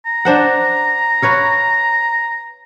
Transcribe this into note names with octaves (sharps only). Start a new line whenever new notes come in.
A#5
D4 C5 F#5
B4 C#5 F5